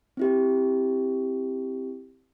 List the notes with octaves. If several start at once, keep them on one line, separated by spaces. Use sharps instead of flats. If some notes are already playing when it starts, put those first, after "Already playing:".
C4 E4 G4